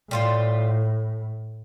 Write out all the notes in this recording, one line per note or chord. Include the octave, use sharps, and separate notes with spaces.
A2 G3 F4 C5